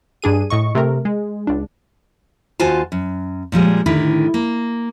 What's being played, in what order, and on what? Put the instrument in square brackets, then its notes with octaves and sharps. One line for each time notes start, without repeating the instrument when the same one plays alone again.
[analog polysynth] G2 D4 G#4 D#7
A2 D#5 C#6
C3 A3 A#4
G#3
C#2 D4
[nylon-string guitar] D#2 F4 F#4 C5 G#5 A5
F#2
A#2 F3 G3 G#3
A2 D3 D#3 E4
A#3